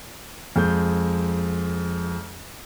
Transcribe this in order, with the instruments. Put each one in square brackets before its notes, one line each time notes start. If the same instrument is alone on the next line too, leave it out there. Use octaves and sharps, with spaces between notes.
[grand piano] F2 G#3 G6